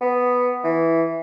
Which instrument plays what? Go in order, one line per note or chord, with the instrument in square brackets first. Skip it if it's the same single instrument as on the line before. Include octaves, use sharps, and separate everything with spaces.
[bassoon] B3
E3